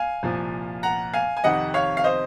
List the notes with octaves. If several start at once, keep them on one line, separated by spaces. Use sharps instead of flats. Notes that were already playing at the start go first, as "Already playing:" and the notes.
Already playing: F5 G#5
C2 A#2 F3
F#5 A#5
F5 G#5
G#5
F2 C3 D#3 D#5 F#5
C#5 F5
F5
C5 D#5